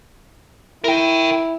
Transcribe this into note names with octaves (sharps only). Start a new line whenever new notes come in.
E4 A#4 G5